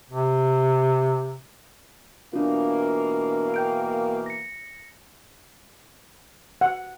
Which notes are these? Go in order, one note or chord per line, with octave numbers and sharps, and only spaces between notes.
C3
B2 E3 A#3 D4 F4
G5 G6 D7
A#6 C#7
F#5